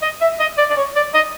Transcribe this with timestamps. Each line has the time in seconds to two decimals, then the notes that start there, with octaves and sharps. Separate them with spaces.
0.02 D#5
0.21 E5
0.40 D#5
0.58 D5
0.70 D5
0.76 C#5
0.96 D5
1.14 D#5